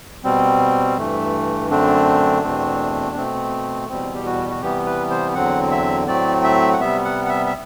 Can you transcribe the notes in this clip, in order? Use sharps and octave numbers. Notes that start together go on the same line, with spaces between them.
B2 G3 C4
G2 E3 A3
F#2 D3 A3 C4 D4
E2 B2 A3 C4
B2 A3 C4
E2 B2 G3 C4
G4
F#4
F#4
C3 E3 G3 B3 G4
B4
C5
E2 D3 F#3 C4 F#5
E5
A2 F#3 A3 C4 D5
E5
F#5
C3 G3 B3 E5
F#5
F#5
E5
E5